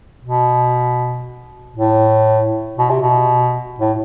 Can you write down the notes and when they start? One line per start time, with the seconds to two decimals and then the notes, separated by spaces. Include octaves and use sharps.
0.23 B2
1.77 A2
2.78 B2
2.90 C3
3.02 B2
3.80 A2